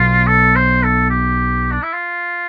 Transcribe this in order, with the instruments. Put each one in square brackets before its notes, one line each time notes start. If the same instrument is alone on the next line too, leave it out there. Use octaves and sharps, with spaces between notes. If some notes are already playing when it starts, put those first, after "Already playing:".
Already playing: [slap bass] B1 B2 [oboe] F4
[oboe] A4
C5
A4
G4
D4
E4
F4